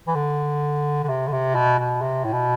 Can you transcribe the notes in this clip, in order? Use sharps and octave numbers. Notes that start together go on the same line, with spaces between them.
E3
D3
D3
C3
D3
C3
B2
B2
C3
A2
B2